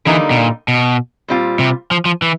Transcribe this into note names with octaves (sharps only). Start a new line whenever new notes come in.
D3 E3 G3 A#3 D#4
B2
A#2
B2
A#2 G3 C4 F4
C3
F3
F3
E3